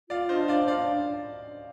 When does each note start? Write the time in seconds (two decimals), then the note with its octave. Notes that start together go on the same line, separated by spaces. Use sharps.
0.10 F4 D5 F5
0.29 D4 C5 D#5
0.48 C5 D5 F5
0.68 D4 D5 F5